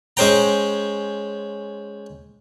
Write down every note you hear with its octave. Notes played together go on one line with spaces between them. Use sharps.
G#3 C#4 C5 G5 A#5